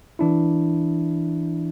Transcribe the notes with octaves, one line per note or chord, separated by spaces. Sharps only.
E3 D4 E4